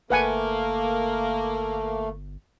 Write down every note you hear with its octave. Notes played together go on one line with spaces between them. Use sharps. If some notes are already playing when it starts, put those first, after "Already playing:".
G1 A3 A#3 B4 F#5 G#5